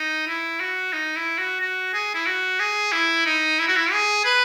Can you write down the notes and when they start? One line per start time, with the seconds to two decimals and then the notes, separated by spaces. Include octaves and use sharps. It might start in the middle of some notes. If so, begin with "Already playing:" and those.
Already playing: D#4
0.27 E4
0.60 F#4
0.93 D#4
1.16 E4
1.38 F#4
1.60 F#4
1.94 G#4
2.15 E4
2.27 F#4
2.60 G#4
2.93 E4
3.26 D#4
3.59 E4
3.68 F#4
3.77 E4
3.92 G#4
4.25 B4